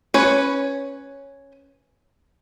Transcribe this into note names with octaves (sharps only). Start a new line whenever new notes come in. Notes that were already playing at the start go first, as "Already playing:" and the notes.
C#4 B4 C#5